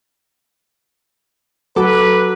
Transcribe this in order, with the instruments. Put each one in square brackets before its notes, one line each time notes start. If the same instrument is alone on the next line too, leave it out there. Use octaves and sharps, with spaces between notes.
[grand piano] F#3 [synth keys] A4 D6 [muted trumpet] B4